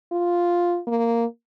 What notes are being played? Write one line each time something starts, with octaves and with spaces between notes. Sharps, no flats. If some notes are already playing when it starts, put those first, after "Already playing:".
F4
A#3